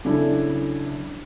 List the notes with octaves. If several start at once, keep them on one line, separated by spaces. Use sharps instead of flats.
C#3 F#3 D4 E4 A4